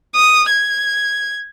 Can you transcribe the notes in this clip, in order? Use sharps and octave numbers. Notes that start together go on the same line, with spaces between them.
D#6
G#6